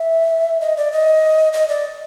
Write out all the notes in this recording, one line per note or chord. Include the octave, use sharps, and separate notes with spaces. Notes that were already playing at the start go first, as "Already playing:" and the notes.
Already playing: E5
D#5
D5
D#5
D#5
D5